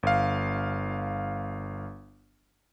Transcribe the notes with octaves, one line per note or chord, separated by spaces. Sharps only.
G1 F5